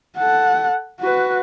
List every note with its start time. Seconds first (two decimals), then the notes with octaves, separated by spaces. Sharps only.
0.17 A4 F#5
1.00 F#4 B4